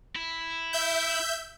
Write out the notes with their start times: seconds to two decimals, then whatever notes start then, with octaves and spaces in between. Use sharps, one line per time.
0.16 E4
0.73 E5 G6